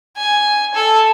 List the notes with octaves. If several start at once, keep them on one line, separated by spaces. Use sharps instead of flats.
G#5
A4